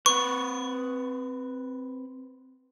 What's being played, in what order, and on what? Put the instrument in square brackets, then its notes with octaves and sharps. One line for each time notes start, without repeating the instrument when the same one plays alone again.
[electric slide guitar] C4 B4 [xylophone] C#6